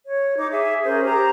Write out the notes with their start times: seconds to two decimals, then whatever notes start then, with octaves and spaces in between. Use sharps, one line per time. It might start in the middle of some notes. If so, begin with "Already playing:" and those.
0.06 C#5
0.38 D#4 D6
0.51 G#4 E5
0.83 C#4 G#4 A#4 C5
1.03 G4 C5 A#5